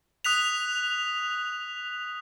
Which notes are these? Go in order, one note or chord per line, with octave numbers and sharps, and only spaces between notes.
D#6 F#6 B6 F7